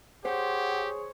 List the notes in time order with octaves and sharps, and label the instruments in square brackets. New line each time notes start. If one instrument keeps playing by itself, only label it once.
[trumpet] G4 [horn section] G#4 C#5 [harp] C5 [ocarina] F#5